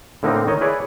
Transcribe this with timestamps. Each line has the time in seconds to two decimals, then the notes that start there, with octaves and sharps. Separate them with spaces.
0.23 A2 D3 A#3 C4 D#4
0.47 D#3 C#5 D#5
0.61 E4 G#4 B4 C#5 D5